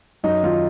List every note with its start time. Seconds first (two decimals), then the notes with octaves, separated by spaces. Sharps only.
0.23 F#2 D#4
0.43 D#3 F4